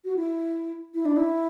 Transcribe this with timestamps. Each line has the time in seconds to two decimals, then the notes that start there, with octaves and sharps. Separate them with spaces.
0.05 F#4
0.16 E4
0.95 E4
1.05 D4
1.17 E4